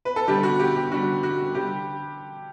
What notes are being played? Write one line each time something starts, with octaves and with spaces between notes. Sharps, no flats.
B4
A4
D3 G3 G4
F#4
G4
G4
D3 G3 F#4
F#4
D3 G3 G4